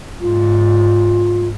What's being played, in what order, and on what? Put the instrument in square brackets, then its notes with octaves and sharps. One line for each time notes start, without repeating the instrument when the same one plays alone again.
[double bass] G#2 [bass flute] F4